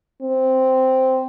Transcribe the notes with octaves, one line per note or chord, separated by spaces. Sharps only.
C4